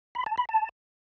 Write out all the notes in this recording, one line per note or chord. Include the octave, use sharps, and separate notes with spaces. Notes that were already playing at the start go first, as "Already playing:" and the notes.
B5
A5
B5
A5